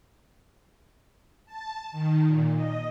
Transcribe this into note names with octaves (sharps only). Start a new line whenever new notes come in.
A5
D#3
A#2
D#5